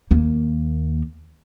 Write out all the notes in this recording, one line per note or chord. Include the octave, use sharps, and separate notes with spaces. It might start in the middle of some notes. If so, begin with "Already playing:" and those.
D#2 A#3